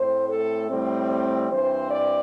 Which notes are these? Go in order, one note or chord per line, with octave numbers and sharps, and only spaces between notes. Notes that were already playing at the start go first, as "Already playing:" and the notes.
Already playing: A2 A3 C4 C5
A4
A2 G3 C4
G2 E3 C4 C5
D5